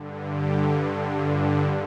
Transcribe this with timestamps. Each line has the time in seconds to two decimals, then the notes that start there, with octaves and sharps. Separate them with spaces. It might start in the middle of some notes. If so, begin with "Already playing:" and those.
Already playing: G2 D3
0.30 G4
0.76 G2 D3
1.23 F4